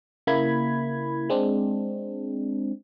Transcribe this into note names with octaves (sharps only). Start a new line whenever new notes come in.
C#3 A#3 E4 B5 G#6
G#3 C4 D4